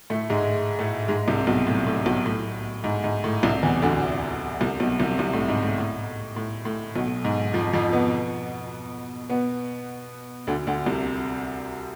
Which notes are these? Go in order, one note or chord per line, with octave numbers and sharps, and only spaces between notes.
A2 A3
G#2 G#3
A2 A3
G#2 G#3
C2 C3
B1 B2
A2
A2
B1 B2
A2
G#2
G#2
A2
C2 C3
E2 E3
D2 D3
C2 C3
B1 B2
C2 C3
C2 C3
A2
G#2
A2
A2
A2
A2
B1 B2
G#2
F2 F3
F2 F3
B2 B3
B2 B3
D2 D3
D2 D3
C2 C3